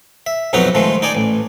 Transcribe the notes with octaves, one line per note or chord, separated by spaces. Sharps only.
E5
B1 F2 F#3 D#4 B4 A#5
D#3 F3 G#3 A3
D#4 D5 G#5
A1